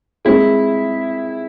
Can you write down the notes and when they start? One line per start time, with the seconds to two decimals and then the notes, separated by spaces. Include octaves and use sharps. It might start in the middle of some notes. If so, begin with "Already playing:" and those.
0.25 G#3 C4 E4 G#4